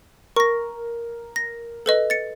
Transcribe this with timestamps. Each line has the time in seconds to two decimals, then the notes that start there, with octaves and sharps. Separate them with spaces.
0.36 A#4 C#6 A#6
1.36 A#6
1.86 A4 B4 D#5
2.10 A6 C#7